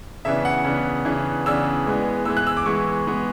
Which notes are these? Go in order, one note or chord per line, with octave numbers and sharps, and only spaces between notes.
C#3 E3 B3 D4 E5
F#5
C#3 E3 B3 D4
C#3 E3 B3 D4
C#3 E3 B3 D4 E6
E3 G#3 B3
E3 G#3 B3 E6
F#6
E6
D6
E3 G#3 B3 C#6
E3 G#3 B3